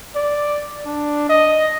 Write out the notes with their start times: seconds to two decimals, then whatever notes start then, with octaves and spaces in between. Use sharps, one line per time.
0.15 D5
0.86 D4
1.29 D#5